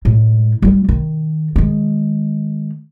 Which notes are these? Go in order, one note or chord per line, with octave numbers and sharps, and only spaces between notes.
A2 G#3
G3 F4
D#3
D#3 G#3